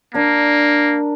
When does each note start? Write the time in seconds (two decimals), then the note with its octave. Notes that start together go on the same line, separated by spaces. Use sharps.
0.14 A#3 D4 A#4